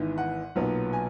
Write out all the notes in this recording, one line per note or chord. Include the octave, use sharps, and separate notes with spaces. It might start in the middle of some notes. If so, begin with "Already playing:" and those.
Already playing: G#1 G#2 E3 B3
F#5
B1 A#2 F#3 B3
G#5